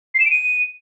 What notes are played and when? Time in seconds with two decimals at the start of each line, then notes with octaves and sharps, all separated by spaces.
0.14 C7
0.20 E7
0.25 D7
0.31 D#7